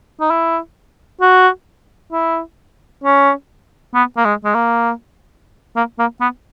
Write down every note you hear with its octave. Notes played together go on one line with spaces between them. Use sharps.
D#4
E4
F#4
E4
C#4
B3
A#3
G#3
G#3
A#3
A#3
A#3
B3